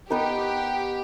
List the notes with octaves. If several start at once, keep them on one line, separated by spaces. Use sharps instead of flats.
B3 D#4 G4 B4